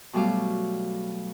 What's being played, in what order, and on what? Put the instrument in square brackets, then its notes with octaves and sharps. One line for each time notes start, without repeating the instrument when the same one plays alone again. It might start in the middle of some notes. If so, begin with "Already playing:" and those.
[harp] B2 F#3 G3 A3 F5 D6